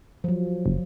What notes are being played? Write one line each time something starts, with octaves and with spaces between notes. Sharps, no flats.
F3 F#3
F#1